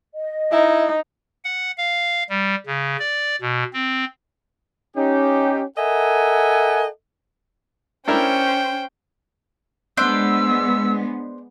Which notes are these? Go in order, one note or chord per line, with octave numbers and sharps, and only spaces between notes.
D#5
D#4 E4
F#5
F5
G3
C#3
D5
B2
C4
C#4 D#4 G4
A4 A#4 D#5 E5 F#5 G#5
C#4 D4 E4 A#4 C5 G5
G#3 B3 D4 C5 D5 E6